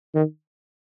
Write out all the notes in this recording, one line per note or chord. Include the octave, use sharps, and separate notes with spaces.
D#3